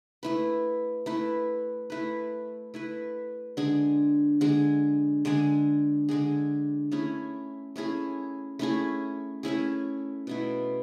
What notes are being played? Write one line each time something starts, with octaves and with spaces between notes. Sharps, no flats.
A3 E4 B4
A3 E4 B4
A3 E4 B4
A3 E4 B4
D3 G#3 D4 G#4
D3 G#3 D4 G#4
D3 G#3 D4 G#4
D3 G#3 D4 G#4
A3 C#4 E4 G#4
A3 C#4 E4 G#4
A3 C#4 E4 G#4
A3 C#4 E4 G#4
B2 A3 E4